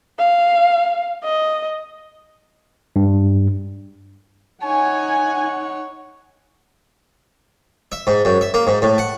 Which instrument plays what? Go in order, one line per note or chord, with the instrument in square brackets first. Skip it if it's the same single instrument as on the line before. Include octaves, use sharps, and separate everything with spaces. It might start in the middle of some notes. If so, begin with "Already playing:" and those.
[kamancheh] F5
D#5
[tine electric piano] G2
[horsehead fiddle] D#4 F#5 [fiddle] C#5 [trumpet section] G#5
[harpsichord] E5
G#2
F#2
E5
A#3
G#2
A2
F#5